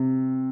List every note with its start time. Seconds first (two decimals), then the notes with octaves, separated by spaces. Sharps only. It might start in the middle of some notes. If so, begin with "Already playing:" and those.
Already playing: C3